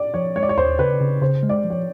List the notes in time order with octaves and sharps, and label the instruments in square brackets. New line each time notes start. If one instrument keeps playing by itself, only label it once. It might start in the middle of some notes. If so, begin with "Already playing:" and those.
Already playing: [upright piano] D5
[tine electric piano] F3 [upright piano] C#5
[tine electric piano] G#3 [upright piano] C#5
[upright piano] D5
C#5
[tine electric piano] D#2 [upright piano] C5
[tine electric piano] C#3 [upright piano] B4
[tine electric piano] C#3
[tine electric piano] C#3 [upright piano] C5
[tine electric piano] G#3
[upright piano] D5
[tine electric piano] F3
[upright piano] C#5